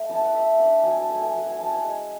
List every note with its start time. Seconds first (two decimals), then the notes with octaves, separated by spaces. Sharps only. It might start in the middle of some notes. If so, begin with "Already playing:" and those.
Already playing: A3
0.10 C#4 E4 A5
0.21 F#5
0.33 A3 E5
0.59 D4 F#5
0.83 F#3 G#5
0.97 A5
1.09 A3 E4 G#5
1.21 G#5
1.33 F#3 F#5
1.46 G#5
1.59 C#4 E4 A5
1.71 G#5
1.84 G#3 G#5